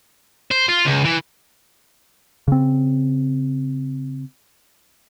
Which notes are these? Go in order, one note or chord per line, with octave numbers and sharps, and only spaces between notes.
C5
F4
C#2
E3
C#3 C4